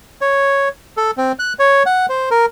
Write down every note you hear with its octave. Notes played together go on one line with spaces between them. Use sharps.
C#5
A4
C4
F#6
C#5
F#5
C5
A#4